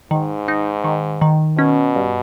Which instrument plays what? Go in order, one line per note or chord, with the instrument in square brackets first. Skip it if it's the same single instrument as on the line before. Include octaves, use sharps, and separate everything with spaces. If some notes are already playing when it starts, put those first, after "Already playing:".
[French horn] G#2 [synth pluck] D#3
[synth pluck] D#4
D#3
D#3
[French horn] B2 [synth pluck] C#4
[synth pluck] G2